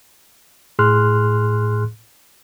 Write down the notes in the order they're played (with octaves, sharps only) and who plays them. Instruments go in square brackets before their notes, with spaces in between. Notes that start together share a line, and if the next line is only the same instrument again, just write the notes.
[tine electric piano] A2 G#4 C6 F6 F#6